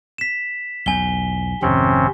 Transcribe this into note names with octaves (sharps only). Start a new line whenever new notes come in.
B6 E7
B1 E2 G#5 G7
G#1 F2 C3 D#3 C4 C#4